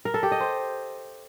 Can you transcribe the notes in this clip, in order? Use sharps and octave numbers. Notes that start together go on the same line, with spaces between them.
A#4
A4
G4
D#5
C5